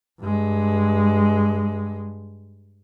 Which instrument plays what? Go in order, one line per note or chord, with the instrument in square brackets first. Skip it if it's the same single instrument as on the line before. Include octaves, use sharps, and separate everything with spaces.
[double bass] G2 G#3